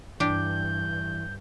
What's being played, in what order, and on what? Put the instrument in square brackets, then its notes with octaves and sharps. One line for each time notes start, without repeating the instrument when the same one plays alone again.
[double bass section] G2 [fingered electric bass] E3 [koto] D4 G4 [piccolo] G6